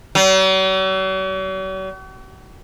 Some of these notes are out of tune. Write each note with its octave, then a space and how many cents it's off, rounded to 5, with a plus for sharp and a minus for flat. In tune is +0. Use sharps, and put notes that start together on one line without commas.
F#3 +45